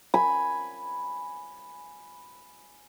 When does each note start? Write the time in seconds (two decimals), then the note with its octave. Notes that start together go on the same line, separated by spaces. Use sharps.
0.14 G#5 B5